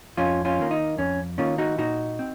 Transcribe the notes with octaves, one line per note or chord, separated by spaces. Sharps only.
F2 C#4 F4
C#4 F4
D#3 A#3
D#4
F2 C#4
D#3 A#3 C#4 F4
D#4 F#4
A#2 D#4 F#4
C4